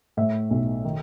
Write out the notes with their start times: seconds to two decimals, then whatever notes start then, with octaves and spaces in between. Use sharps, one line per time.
0.17 A2 E5
0.51 B1
0.85 D#3